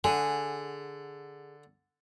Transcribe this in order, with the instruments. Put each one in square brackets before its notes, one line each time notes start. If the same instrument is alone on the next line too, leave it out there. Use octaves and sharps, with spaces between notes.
[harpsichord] D3 [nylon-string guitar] G#4 F#5 G#5